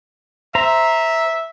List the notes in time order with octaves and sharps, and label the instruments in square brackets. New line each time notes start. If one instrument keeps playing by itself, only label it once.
[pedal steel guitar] C5 A#5 [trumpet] E5